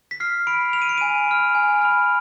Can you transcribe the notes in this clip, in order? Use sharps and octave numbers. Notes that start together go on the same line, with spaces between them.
B6
F6 C7
B5 D7
F6 F7
D#7
D7
G#5 D#7
B5 F6
G#5
B5 F6